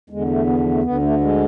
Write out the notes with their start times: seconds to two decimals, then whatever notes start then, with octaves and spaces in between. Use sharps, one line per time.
0.10 E2 D3 G#3
0.29 A3
0.47 B3
0.59 F3
0.72 A3
0.83 D2 D3 B3
1.02 A3
1.20 G#3